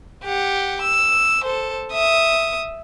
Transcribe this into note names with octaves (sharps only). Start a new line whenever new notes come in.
G4 F#5
E6
A4 C5
E5 D#6